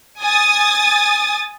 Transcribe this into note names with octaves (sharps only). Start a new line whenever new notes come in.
G#5 D#6 A6